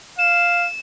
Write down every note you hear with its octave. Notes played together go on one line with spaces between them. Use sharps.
F5 E7